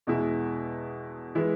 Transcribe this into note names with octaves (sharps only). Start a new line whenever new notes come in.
E2 B2 G#3 E4
E3 G#3 E4